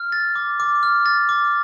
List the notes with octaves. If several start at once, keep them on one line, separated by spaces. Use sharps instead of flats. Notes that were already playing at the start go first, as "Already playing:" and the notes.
Already playing: F6
A6
D6
D6
F6
A6
D6